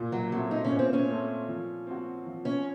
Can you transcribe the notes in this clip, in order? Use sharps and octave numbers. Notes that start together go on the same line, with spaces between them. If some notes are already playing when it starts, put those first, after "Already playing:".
Already playing: A#2
F#3
F#3 A3 C4
D#4
C#4
A#2
C4
C#4
A3 C4
F3
C4 F#4
F3
C#4